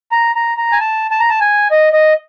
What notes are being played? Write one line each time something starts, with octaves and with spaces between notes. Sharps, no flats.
A#5
A#5
A#5
G#5
A5
A5
A#5
A5
G#5
D#5
D#5